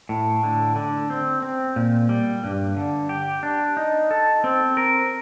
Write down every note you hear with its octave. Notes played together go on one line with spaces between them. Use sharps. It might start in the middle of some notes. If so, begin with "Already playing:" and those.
A2
D3
D3
C4
C4
A#2
G3
G2
D3
G4
D4
D#4
A4
C4
A#4